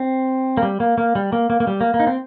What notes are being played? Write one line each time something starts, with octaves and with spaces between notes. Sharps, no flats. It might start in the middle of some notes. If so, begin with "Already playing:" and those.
Already playing: C4
A#3
G3
A#3
A#3
G3
A#3
A#3
A#3
G3
A#3
A#3
D#4
C4